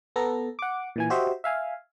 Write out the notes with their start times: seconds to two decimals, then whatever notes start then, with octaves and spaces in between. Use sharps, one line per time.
0.16 B3 A4 A#5
0.59 F#5 D6
0.96 A#2 E3 G#5
1.10 F#4 G4 C5 D#5 E5
1.44 E5 F5 G#5